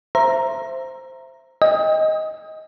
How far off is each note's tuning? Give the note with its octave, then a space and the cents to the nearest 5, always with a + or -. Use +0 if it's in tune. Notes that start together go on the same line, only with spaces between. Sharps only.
C5 +0 E5 +15 A#5 +0
D#5 +10 G5 +30